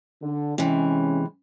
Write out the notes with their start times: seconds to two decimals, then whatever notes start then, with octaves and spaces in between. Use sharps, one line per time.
0.22 D3
0.58 C3 E3 G#3 C#4